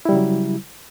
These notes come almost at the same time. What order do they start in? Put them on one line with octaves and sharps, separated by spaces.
E4 G3 C#3 F#3